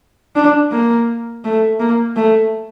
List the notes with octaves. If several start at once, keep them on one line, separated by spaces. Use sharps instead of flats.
D4
A#3
A3
A#3
A3